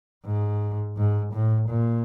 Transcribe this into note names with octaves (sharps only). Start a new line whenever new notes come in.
G#2
G#2
A2
A#2